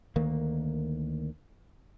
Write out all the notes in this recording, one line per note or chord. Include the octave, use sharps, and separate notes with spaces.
D2 D#3 A#3